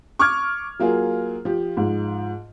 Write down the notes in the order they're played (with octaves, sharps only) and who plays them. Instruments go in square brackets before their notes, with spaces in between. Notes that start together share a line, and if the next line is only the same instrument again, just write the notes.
[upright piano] C#6 D6 F6 G#6
F#3 A#3 F4 G#4
F3 G4
G#2 F3